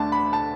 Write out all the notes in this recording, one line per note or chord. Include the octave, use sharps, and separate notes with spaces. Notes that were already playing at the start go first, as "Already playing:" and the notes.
Already playing: D2 D3 A3 D4 A5
B5
A5